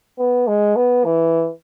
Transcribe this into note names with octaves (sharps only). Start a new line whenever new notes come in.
B3
G#3
B3
E3